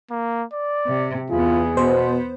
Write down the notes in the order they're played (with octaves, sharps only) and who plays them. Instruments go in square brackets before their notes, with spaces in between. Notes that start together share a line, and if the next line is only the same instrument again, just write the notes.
[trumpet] A#3
D5
[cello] C3
[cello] E2 B3 [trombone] F4 [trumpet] G#4
[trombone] B2 [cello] B3 [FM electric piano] C5